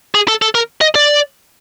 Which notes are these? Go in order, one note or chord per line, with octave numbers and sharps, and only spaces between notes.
G#4
A4
A4
A#4
D#5
D5